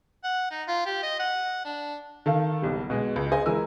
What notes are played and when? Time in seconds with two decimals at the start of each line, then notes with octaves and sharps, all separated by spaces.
0.24 F#5
0.51 D#4
0.68 F4
0.86 G4
1.03 D#5
1.19 F#5
1.65 D4
2.26 D#3 A4 F5
2.62 F#1 B1 G3
2.90 B2 G#3 G#4
3.16 C#2
3.32 G#4 C5 D#5 G#5
3.46 E3 G#3 A#4 G#5 E6